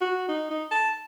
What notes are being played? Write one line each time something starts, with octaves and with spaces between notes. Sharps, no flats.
F#4
D#4
D#4
A5